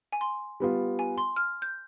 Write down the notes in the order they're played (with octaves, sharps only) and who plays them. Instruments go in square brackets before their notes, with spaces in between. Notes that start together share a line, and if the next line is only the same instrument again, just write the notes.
[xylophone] G#5
C6
[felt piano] G3 B3 F4
[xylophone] G#5
C6
F6
G6